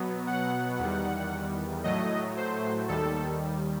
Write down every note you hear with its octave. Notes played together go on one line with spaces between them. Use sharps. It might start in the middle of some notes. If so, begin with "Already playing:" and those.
Already playing: B2 F#3 B3
F#5
E2 D#3 G3
A2 F#3 A3 D#5
C5
D#2 D#3 G3 A4